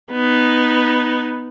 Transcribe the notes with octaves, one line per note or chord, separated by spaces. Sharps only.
B3 D#4